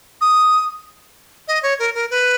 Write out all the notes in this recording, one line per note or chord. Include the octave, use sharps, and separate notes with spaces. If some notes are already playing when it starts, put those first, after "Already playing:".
D#6
D#5
C#5
A#4
A#4
B4